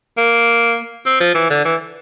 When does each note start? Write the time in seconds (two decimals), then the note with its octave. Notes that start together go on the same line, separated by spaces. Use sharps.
0.17 A#3
1.06 C4
1.21 F3
1.35 E3
1.50 D3
1.65 E3